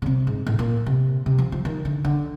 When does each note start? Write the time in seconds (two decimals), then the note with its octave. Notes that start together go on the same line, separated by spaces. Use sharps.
0.02 C#3
0.06 C3
0.27 G#2
0.47 A2
0.59 A#2
0.86 C3
1.26 C3
1.38 F3
1.52 F3
1.65 D#3
1.85 D3
2.05 D3